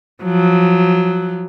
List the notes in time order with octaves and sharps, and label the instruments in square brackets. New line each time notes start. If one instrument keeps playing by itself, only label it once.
[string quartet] F3 F#3